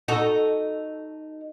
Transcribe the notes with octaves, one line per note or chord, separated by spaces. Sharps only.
D#4 F#4 A4